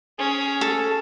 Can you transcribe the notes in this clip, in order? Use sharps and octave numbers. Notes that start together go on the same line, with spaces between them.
C#4 G#4
A4